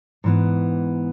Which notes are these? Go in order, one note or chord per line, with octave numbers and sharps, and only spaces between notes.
G#2 E3 B3